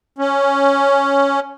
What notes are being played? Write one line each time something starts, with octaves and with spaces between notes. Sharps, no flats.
C#4